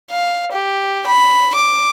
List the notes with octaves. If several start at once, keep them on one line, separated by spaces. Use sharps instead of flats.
F5
G4
B5
D6